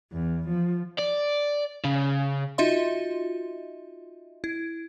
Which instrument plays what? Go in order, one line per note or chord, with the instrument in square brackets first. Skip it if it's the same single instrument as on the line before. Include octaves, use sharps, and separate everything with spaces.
[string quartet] E2
F3
[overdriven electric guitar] D5
C#3
[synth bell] D#4 F4 F#4 D#5 E5 C6
E4